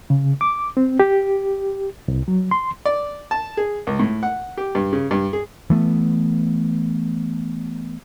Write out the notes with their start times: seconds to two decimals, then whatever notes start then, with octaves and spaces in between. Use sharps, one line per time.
0.10 C#3
0.41 D6
0.77 C4
1.00 G4
2.08 C2
2.28 F#3
2.51 C6
2.85 D5
3.31 A5
3.57 G#4
3.87 C#2
3.99 A2
4.23 F#5
4.57 G4
4.75 G2
4.93 C#3
5.11 G2
5.33 G#4
5.70 E3 A3 B3